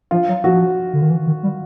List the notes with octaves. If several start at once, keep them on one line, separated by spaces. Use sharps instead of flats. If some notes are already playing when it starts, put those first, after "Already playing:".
F3 F4
F#3
F3 F#4
D3
D#3
E3
D#3
G3